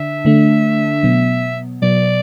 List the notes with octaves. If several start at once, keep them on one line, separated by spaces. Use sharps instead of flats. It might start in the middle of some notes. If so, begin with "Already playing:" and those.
Already playing: D3 D4 E5
D3 A3 D4
B2 F#3 B3
B2 F#3 B3 D5